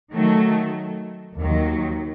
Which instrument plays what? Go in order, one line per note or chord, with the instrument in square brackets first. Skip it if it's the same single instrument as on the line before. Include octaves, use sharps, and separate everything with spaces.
[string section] D#3 F#3 A3
D#2 D#3 F#3